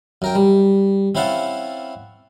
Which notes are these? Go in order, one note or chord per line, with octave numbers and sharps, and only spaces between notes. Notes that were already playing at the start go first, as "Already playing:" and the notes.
F#2 A#4 G5
G3
C4 C#4 E4 F5 F#5 A5